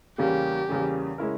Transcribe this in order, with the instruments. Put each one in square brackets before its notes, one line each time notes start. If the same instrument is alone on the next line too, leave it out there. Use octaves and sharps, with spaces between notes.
[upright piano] E2 C#3 G3 A#3 C#4 [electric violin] G4
[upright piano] E2 C#3 G3 A#3 C#4
C#3 G#3 C#4 E4 A#4